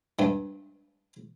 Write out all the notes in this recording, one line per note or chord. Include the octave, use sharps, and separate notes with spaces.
G2 G3